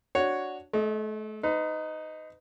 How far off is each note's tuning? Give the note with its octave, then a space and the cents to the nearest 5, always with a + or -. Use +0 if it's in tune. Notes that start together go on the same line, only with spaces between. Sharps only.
D4 +0 F#4 +0 C#5 +0
A3 -35 D#5 +0
D#4 +0 B4 +40